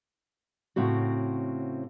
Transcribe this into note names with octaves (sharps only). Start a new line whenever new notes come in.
A2 C#3 C4 F#4